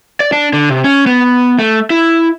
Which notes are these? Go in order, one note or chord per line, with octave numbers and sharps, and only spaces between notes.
D5
D4
D3
C3
C#4
B3
A3
E4